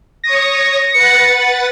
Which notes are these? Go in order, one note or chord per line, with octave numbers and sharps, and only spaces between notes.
C#5 C#6 D#6 A#6
B4 F#5 A6 C#7